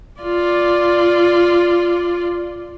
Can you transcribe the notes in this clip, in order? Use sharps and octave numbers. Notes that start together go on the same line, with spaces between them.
F4 D5